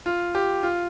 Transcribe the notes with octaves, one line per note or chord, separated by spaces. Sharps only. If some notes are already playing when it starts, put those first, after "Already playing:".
F4
G4
F4